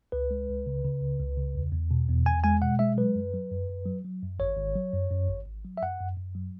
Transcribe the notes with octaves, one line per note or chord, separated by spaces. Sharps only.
C#2 B4
G#3
C#2
C#3
C#3
C#2
C#2
C#3
E2
E2
B2
E2
E2 G#5
G#3 G#5
B2 F#5
G#3 E5
F#3 B4
F#2
F#3
F#2
F#2
F#3
F#3
F#2
G#1 C#5
G#1
F#3
F#2
F#2
G#1
G#1
F#3
E5
F#2 F#5
F#2
F#2
F#3